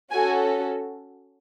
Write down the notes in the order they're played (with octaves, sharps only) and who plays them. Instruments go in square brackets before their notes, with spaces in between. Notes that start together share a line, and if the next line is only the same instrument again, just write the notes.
[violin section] C#4 F#4 A4 G#5